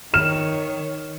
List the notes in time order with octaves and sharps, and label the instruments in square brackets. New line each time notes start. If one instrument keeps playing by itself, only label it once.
[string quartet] D#3 C#5 [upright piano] F6 E7